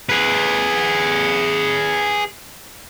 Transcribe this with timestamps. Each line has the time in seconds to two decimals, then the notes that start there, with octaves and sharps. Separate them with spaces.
0.09 G#4 B4